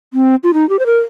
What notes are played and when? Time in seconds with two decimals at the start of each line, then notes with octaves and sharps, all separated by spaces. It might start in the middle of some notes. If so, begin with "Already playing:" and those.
0.14 C4
0.43 F4
0.54 D#4
0.69 G4
0.79 C5
0.86 A#4